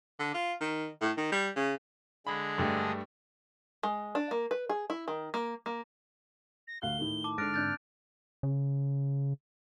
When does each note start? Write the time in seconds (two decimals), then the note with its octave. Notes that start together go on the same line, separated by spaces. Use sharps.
0.19 D3
0.34 F4
0.61 D#3
1.01 A2
1.17 D#3
1.32 G3
1.56 C#3
2.27 D3 G#3 G#4 B5
2.58 G2 A3
3.83 G#3
4.15 D4
4.31 A#3
4.51 B4
4.69 G#4
4.90 E4
5.08 D#3
5.34 A#3
5.66 A#3
6.68 A#6
6.82 D2 F5 F#6 G7
6.98 A2 D#3 A3
7.24 A5 D6
7.38 G#2 D3 F6 F#6 A6 A#6 D7
7.54 C4 D4 F#6 G6 A6
8.43 C#3